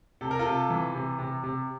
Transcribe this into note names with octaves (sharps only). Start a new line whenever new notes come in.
C3 A4
A#4
F4 A4
C3
E3
C3
C3
C3